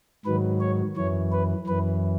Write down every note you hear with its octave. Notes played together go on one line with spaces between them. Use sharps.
G#2 D#3 F#3 B4
C#5
F#2 E3 C#5
B4
F#2 E3 B4